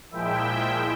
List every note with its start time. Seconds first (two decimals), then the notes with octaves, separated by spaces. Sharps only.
0.11 A#2 F3 G#3 E4 E5 G5